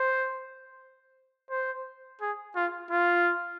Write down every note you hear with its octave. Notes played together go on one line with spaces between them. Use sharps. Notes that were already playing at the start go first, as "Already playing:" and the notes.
Already playing: C5
C5
G#4
F4
F4